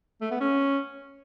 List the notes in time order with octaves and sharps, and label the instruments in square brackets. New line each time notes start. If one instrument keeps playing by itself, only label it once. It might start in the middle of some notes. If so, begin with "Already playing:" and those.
[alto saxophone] A3
B3
C#4